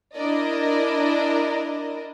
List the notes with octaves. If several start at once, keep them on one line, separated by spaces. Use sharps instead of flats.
D4 E4 A#4 D5 D#5